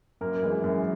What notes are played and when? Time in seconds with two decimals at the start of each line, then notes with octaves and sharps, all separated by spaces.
0.21 F#2 A#3 A#4
0.43 E3 G#3
0.64 F#2